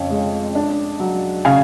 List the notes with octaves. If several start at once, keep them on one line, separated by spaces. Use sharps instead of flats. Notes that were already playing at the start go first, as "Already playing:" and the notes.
Already playing: F2 C#3 C#5 F5
G#3
D4
F#3
C#3 F5 G#5